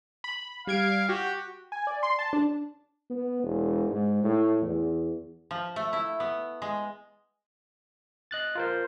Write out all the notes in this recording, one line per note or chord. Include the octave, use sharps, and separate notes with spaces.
B5
G3 F5 G#6 D7
F#4 G4
G#5
D5
C6
A5
D4
B3
E1
G#2
A2
E2
F3
A3
E4
B3
G#3
D#5 F#6 A6
F4 A#4 C5